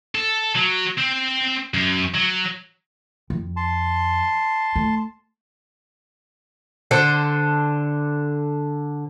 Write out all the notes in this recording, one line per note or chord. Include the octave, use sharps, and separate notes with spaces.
A4
F#3
C4
F#2
F#3
F2
A5 C6
A3
D3 A4 C5